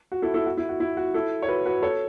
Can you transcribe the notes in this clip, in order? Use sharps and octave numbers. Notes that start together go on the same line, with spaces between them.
F#4
E4 A4
E4 A4
F#4
E4
F#4
E4
F#4
E4 A4
C#5
F#4 B4
F#4 B4
A4 C#5